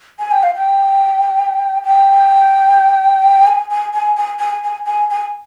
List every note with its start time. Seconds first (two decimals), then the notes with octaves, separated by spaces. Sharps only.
0.19 G#5
0.31 G5
0.43 F5
0.55 G5
1.83 G5
3.47 G#5
3.71 G#5
3.94 G#5
4.17 G#5
4.40 G#5
4.64 G#5
4.86 G#5
5.11 G#5